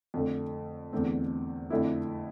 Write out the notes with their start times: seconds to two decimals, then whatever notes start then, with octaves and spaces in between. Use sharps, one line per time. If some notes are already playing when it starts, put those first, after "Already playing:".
0.14 F2 D3 A3
0.93 E2 D3 A3 C4
1.70 F2 D3 A3 E4